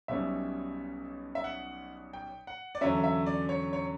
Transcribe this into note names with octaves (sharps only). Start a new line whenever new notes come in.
B1 B2 G3 C#4 E5
E5
F#5
G5
F#5
D5
E2 D3 F#3 C#4 E5
E5
D5
C#5
C#5